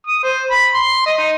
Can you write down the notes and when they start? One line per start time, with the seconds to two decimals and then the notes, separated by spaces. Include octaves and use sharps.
0.07 D#6
0.23 C5
0.51 B5
0.74 C6
1.06 D#5
1.18 D#4